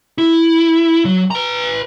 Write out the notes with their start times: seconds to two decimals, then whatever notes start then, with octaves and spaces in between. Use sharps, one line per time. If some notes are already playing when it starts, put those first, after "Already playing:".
0.18 E4
1.05 F#3
1.31 B4 A#5